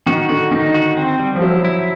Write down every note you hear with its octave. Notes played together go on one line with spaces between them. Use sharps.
D#3 F#4
D3 F#4
D#3 D#4
F#4
C4
G3
F3
F#3 E4
E4